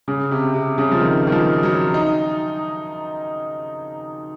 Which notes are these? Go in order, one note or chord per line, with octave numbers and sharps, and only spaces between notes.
C#3
C3
C3
C#3
F3
D#3
D#3
F3
F#3
D#4